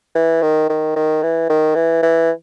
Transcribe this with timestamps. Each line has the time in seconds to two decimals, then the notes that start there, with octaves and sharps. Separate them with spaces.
0.15 E3
0.42 D#3
0.69 D#3
0.96 D#3
1.22 E3
1.50 D#3
1.75 E3
2.03 E3